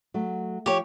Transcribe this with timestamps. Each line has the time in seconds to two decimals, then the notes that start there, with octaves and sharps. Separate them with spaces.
0.14 F#3 A3
0.66 F3 G4 C#5